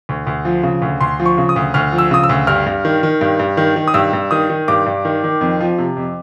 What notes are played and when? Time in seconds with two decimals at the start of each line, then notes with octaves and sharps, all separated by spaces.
0.09 D2
0.27 D2
0.45 F3
0.63 C#3
0.82 D2
1.01 D2 C6
1.20 F3
1.26 C#6
1.38 C#3
1.49 D#6
1.56 D2
1.74 D2 F6
1.92 F3
1.98 E6
2.11 C#3 D#6
2.24 E6
2.29 D2
2.47 G2 F6
2.66 G2
2.85 D#3
3.03 D#3
3.21 G2
3.39 G2
3.57 D#3
3.76 D#3
3.88 D#6
3.94 G2 E6
4.13 G2
4.31 D#3 D#6
4.50 D#3
4.68 G2 D6
4.86 G2
5.05 D#3
5.24 D#3
5.41 F2
5.60 F3
5.78 C3
5.97 F2